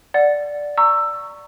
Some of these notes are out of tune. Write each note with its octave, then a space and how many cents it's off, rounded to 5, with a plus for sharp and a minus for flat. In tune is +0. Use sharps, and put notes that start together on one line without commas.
D5 +0 F#5 +0
A#5 -25 C#6 +0 E6 +10